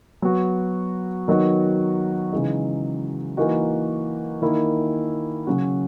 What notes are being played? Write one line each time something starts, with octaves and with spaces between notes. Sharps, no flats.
F#3 B3 F#4
D#3 F#3 B3 D#4 F#4
C#3 E3 G#3 D#4
E3 A#3 D#4 F#4
D#3 A#3 E4
C#3 F#3 C#4 F#4